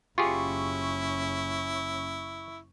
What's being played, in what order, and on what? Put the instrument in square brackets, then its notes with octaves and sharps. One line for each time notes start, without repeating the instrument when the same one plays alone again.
[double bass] F#1 C#4 [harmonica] E4 [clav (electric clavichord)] F4 G4 G#4 [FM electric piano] C#6